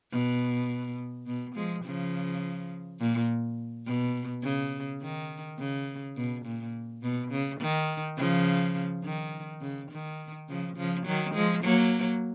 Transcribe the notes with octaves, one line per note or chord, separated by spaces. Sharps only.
B2
B2
F3 G#3
C#3 F3
A#2
B2
C#3
D#3
C#3
B2
A#2
B2
C#3
D#3
C#3 F3
D#3
C#3
D#3
C#3 F3
C#3 F3
D#3 F#3
F3 G#3
F#3 A#3